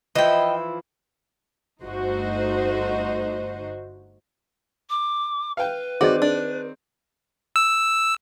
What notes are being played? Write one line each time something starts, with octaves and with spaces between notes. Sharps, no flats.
E3 F3 E4 D#5 G5
G1 A3 D#4 F#4 C5 D#5
D6
B4 F5 G5
D#3 C4 F#4 G#4 C5 D5 D#5
D4
E6